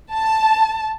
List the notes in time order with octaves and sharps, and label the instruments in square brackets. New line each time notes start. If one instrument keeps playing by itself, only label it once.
[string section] A5